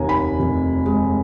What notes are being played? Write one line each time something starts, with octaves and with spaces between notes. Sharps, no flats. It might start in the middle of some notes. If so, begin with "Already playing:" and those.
Already playing: F1 D#2 D#3 G#5 A#5
B5
F1
G#3